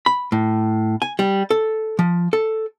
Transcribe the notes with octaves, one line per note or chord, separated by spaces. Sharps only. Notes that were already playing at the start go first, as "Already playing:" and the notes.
B5
A2
G#5
G3
A4
F3
A4